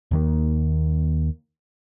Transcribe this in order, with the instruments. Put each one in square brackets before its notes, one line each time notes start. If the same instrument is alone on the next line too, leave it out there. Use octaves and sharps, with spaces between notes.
[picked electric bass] D#2 D#3 A#3